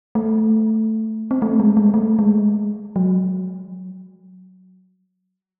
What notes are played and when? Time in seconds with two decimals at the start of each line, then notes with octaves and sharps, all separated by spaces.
0.15 A3
1.31 C4
1.42 A3
1.60 G#3
1.77 G#3
1.94 A3
2.19 G#3
2.96 F#3